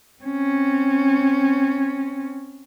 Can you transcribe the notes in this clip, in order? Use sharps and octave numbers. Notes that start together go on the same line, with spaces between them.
C4 C#4